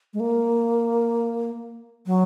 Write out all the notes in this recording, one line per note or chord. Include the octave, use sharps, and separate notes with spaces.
G#3
A#3
F#3